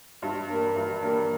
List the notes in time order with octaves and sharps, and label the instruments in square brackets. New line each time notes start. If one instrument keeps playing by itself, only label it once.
[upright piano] G2
G3 A#3
G2
G3 A#3